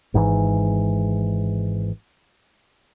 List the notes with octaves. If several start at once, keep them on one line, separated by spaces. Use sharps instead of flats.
G#1 G#2 D3 E3